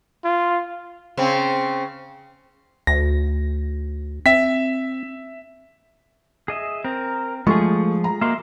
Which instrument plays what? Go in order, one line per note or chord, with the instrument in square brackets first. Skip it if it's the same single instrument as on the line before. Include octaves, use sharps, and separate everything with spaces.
[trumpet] F4
[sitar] C#3 C4
[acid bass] D2 [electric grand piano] A#6
[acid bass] C4 [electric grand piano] E5 B6
[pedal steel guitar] G#4 D#5 E5
[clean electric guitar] C4 [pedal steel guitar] A#4
[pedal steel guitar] F3 [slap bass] G#3 [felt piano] A3 C#6 [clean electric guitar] F4 G#4
[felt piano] A#5
[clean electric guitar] A#3 F#4 D#5 [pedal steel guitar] E5 C6